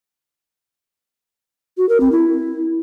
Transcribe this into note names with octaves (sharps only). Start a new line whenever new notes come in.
F#4
A#4
C4
E4